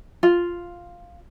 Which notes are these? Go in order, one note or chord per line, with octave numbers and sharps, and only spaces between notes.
F4